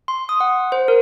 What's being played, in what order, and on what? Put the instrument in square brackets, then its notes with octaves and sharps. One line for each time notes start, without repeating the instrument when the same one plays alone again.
[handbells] C6
D#6
F#5
C5
A#4